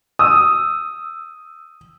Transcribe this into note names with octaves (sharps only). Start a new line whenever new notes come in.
D#6 E6